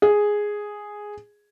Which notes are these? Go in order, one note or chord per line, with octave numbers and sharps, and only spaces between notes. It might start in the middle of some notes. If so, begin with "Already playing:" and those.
G#4